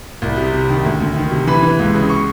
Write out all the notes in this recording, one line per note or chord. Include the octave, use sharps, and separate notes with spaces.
C2
C3
C3
D#3
D2
D2
D#3
C3
E3 B5
E3
C#2
C#3
C#6